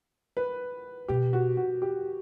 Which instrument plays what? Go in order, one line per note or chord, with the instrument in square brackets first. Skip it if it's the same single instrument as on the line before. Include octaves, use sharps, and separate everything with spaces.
[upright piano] B4
[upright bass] B2 [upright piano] G4
[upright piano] F#4
F#4
G4